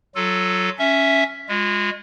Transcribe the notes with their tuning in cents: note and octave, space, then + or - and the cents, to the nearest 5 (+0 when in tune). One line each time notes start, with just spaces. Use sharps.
F#3 +5 F4 +10 A4 +0
C#4 +0 E5 +0
G#3 -25 F4 +35